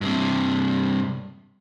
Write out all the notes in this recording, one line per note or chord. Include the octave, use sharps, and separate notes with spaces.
G2 C3